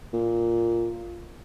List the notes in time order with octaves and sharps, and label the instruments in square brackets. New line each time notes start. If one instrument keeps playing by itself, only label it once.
[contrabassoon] A#2